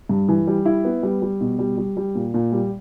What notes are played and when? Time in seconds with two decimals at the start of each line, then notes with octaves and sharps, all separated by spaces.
0.09 G2
0.29 E3
0.47 G3
0.65 E4
0.85 B3
1.03 G3
1.22 G3
1.41 B2
1.59 G3
1.78 G3
1.97 G3
2.15 A#2
2.34 A#2
2.52 G3